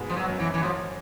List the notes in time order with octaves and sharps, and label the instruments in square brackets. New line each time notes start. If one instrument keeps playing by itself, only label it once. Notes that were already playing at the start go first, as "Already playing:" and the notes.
Already playing: [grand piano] G#2 B2 G#3 B3
[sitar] F3
F#3
[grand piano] F#2 F#3
[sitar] E3
E3
[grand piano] F#2 F#3 [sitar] F3